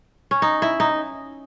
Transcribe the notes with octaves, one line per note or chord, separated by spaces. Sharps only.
C#4
D#4
E4
D#4